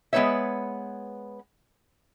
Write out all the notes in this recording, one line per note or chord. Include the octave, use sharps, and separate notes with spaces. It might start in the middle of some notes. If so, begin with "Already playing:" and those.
G#3 B3 C#4 B4 C#5 E5